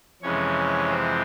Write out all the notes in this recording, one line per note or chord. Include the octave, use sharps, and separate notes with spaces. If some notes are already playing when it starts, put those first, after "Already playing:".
F2 C3 E3 G#3 C#4 C#5
C4 C5